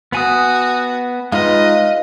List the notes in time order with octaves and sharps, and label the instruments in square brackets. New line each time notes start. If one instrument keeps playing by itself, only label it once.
[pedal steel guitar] B3 G#5 D#6 [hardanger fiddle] F#4
[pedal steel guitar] G#3 D#4 F4 [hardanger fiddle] B4 D#5 [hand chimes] F5